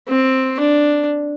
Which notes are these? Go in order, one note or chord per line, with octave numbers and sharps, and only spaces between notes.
C4
D4